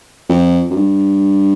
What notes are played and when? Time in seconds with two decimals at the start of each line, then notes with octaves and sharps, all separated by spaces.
0.29 F2
0.70 F#2
0.76 G2